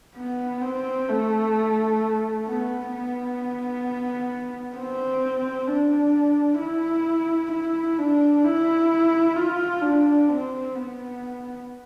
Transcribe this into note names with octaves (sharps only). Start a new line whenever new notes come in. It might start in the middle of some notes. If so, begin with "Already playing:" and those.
B3
C4
A3
B3
B3
C4
D4
E4
E4
D4
E4
F4
D4
C4
B3